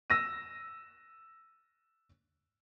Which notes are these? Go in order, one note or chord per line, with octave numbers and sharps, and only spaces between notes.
E6 A#6 D#7